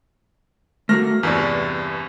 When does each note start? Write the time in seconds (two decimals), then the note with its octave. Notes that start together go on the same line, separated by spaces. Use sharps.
0.89 A3 A#3 F#4 F6 A#6
1.23 E2 G2 C3 B4 D5